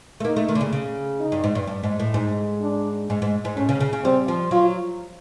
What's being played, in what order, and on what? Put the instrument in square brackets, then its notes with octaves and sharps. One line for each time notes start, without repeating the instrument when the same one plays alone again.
[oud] A3
[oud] A#3 [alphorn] D#4
[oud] A3
D#3
D3
C#3
C#3
[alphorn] D#4
[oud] G2
G#2
G2
G2
G#2
A2
[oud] G#2 [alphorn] D#4
[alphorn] D4
[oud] G#2
G#2
G#2
[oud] A2 [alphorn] C#4
[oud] C#3
C#3
C#3
[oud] G3 [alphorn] C4
[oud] F3
[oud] F#3 [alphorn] F4